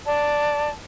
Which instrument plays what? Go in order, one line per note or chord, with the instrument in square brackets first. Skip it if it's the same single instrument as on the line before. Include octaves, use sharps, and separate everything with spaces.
[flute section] D5 A5